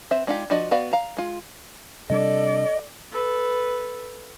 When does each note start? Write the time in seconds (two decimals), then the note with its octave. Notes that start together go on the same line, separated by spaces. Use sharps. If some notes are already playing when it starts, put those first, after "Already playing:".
0.11 C4 B4 C5 E5
0.27 G#3 D4 D#4 F4 G4
0.50 F3 D4 F#4 D5 D#5
0.71 B3 F#4 B4 D5 F5
0.93 F5 A#5
1.17 G#3 F4
2.10 C3 G3 D4 A4 D5 D#5
3.11 A4 B4